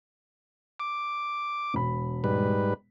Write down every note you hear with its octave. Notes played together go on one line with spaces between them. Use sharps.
D6
E1 B5
G#2 G3 B4